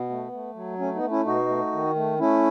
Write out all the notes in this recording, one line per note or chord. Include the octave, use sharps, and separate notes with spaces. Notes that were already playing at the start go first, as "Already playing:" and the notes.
Already playing: B2 B3
A3
A3
F#3
A3 C#4
B3 D#4
A3
C#4 E4
B2 D#4 F#4
A3
D#3
A3
A3 C#4 E4